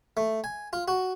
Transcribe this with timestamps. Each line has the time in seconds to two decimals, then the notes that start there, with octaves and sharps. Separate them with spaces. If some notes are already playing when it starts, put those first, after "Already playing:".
0.17 A3
0.44 G#5
0.73 F4
0.88 F#4